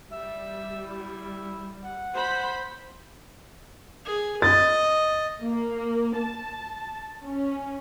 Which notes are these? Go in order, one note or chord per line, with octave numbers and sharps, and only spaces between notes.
G3 E5
E4
F#5
C5 B5
G#4
D#5 A6
A#3
A5
C#4